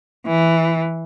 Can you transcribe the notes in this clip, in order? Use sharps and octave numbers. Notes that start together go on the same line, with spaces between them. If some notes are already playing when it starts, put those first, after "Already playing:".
E3